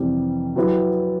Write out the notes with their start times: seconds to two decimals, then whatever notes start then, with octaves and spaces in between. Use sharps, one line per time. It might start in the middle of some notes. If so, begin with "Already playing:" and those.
Already playing: F2 C3 E3 G3
0.56 F#3 B3 E4 G4